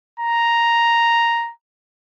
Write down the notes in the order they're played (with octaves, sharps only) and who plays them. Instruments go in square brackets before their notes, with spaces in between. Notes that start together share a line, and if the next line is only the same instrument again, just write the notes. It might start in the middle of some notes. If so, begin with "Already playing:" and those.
[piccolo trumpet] A#5